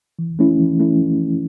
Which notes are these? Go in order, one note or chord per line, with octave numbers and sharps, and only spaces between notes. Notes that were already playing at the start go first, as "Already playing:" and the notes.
E3
A3 C#4 E4
E3
A3 C#4 E4